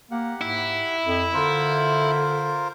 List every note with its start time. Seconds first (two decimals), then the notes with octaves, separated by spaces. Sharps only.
0.11 A#3 G4 F#5
0.41 G#2 E4
1.06 F2
1.34 D3 F4 A#4 C5